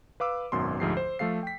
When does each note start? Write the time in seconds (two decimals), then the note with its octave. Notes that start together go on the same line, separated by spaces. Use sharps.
0.20 B4 F5 D6 E6
0.52 G#1 F#2 B2 C6
0.80 D2 G#2 F3 G4 C7
0.97 C5
1.19 F3 A3 A4 F5 C7
1.43 G5 B6